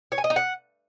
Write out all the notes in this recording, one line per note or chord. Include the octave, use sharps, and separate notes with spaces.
C#5
G#5
D#5
D#4
F#5